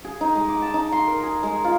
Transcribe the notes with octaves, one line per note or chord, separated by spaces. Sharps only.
G#4
D#4
G#3
D6
A5
D#4
C6
A#4
G#4
G#3
F4